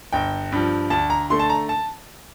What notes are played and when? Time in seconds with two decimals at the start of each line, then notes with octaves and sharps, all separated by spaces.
0.13 G1 G5
0.52 G2 F3
0.90 D2 A5
1.10 A#5
1.30 D3 A3 C6
1.39 A5
1.50 A#5
1.69 A5